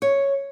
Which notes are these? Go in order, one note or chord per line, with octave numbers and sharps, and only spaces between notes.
C#5